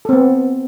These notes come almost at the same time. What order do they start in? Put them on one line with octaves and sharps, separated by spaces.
A4 C4 B3